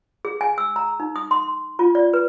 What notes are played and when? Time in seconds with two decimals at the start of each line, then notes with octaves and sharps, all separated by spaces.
0.25 G#4
0.41 G#5
0.58 E6
0.76 A#5
1.00 D#4
1.16 D#6
1.31 C6
1.79 F4
1.95 D5
2.14 B4